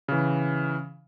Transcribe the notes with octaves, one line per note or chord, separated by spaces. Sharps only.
C#3 E3